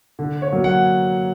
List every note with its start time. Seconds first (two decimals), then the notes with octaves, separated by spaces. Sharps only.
0.19 D3
0.42 C#5
0.52 F#3 A#3
0.64 F#5